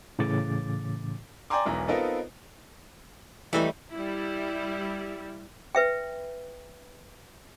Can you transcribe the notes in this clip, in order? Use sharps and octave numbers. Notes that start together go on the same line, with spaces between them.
A2 C#3 E3 D6 A6
D5 G5 G#5 A#5 C6 D6
E1 B1 E3 A#5
B3 C4 D#4 F4 A4 A#4
E3 G3 A3 D#4
G3 E4
B4 E5 G5